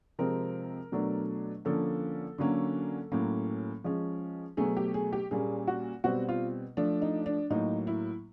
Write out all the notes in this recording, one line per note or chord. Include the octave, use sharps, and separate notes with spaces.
C3 F3 G#3 C4 A#4
B2 F#3 A3 D4
D3 F3 A#3 C#4 A4
D3 F#3 A#3 C#4
A2 F#3 A#3 C#4
F3 G#3 C#4
B2 F#3 A3 G#4
G4
G#4
G4
A#2 G3 A#3 C#4 G#4
F#4
B2 G3 C4 F#4
F4
F3 A3 D4
D#4
D4
A2 F#3 A#3 D#4
E4